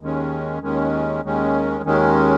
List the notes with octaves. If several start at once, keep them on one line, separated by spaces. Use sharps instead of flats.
D#2 D#3 G#3 C#4
D#2 D#3 G#3 C#4
D#2 D#3 G#3 C#4
D#2 D#3 G#3 C#4